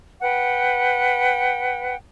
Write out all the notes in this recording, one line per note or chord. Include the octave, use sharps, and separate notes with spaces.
B4 F#5 G5